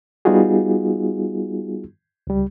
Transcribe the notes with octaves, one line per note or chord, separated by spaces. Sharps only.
G3 B3 D#4 F4 F#4 G#4
C#2 G3